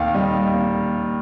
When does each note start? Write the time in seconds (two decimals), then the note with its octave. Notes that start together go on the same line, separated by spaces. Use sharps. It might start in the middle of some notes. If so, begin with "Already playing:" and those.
Already playing: D#2 D#3 F5
0.14 G3 D#5
0.54 A#3